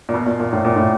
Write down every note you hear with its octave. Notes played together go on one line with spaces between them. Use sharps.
A#2
B2
A#2
A#2
A2
A#2
A2